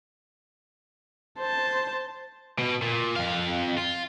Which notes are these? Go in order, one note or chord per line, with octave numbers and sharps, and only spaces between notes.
C5 A5
B2
A#2
F2 F5
F4